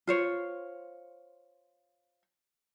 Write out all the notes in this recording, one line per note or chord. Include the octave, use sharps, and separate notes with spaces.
F4 C5 C#5